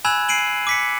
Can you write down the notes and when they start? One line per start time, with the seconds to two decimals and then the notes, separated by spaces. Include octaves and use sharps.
0.05 G#5 B5 E6 F#6 G#6 E7
0.29 C7 D7 D#7 F#7
0.67 D6 B6 C#7